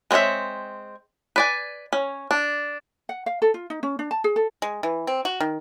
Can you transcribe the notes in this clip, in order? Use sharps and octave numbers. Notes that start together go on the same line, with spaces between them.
G#3 C4 B4 C#5 E5
B4 D5 G#5
C#4
D4
F#5
F5
A4
F4
D#4
C#4
D4
A5
G#4
A4
G#3
E3
C4
F#4
D#3